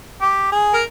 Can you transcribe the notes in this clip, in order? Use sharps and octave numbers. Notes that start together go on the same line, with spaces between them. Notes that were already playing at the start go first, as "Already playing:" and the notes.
G4
G#4
A#4